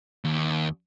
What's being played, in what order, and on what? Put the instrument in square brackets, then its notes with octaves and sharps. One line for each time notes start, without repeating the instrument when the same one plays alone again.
[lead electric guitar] D#2